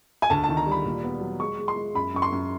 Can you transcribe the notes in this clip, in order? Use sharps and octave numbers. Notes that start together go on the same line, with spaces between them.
G#5
D2 A5
A5
D#3
A#5
G3
B5
A#2
B3
F#3
G#3 C#6
G#3
C6
G#3
F#2 B5
F#2 C#6
C6
F#2